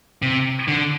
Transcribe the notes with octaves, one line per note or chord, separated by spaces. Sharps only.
C3
D3